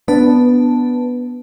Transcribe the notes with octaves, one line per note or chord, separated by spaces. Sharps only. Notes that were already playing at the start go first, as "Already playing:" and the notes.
B3 D4 B4 A5